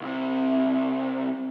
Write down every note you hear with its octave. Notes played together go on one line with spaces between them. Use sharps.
C2 C3